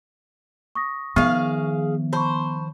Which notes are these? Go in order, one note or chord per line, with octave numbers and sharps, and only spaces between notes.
C#6 D#6 A#6
D#3 F3 B3 G#4 F5
C5 A5 B5 C#6